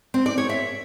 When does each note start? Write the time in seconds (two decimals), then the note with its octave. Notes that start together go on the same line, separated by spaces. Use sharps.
0.14 C4
0.26 D5
0.38 C#5
0.49 E5